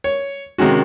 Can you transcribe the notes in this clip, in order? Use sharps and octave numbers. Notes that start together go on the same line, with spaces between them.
C#5
C3 D#3 G#3 C#4 F#4